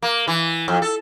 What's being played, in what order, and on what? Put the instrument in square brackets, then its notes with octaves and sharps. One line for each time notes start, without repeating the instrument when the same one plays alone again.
[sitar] A#3
E3
F2
A4